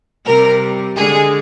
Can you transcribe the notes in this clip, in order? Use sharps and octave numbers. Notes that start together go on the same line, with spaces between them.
C3 G3 A#4
D3 G#3 G#4